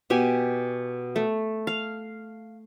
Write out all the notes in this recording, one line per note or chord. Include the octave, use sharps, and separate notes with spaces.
B2 G4 G#5
A3
F5